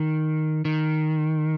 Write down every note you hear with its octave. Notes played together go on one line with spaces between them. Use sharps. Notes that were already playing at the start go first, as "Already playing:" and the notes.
Already playing: D#3
D#3